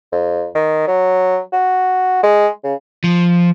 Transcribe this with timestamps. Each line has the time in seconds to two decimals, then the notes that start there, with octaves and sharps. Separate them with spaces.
0.12 F2
0.55 D#3
0.87 F#3
1.52 F#4
2.23 G#3
2.64 C#3
3.04 F3